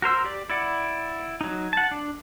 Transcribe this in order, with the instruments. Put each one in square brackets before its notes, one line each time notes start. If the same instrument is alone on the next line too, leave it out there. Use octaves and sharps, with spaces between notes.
[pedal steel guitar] F#4 A#4 C5 E6
G4 D5
E4 D5 F#5
F#3 D#4
F#5 A5
D4